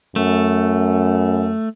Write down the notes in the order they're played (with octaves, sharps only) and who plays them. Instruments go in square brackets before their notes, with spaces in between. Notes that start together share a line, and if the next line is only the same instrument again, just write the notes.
[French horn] F#2 [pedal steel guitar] A3